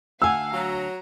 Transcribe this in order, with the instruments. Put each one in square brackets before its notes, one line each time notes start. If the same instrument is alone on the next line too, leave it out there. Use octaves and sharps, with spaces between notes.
[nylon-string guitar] D2 G#5 [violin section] F5 F#5 [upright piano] E6
[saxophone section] F#3 [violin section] A#5